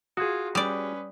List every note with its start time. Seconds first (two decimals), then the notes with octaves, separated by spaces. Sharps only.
0.17 F4 F#4 G#4 D#6 G#6
0.55 G3 C#4 B4 D5 D#6